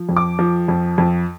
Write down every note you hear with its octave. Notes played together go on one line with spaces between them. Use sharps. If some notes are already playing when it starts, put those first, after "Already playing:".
Already playing: F3
F2
D6
F3
F2
F2